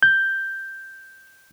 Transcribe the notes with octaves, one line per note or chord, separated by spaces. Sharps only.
G6